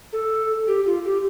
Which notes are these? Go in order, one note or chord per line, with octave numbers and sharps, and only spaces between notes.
A4
G4
F4
G4